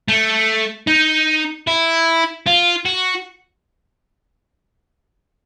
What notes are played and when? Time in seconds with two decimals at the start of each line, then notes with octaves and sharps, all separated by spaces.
0.08 A3
0.87 D#4
1.67 E4
2.47 F4
2.86 F#4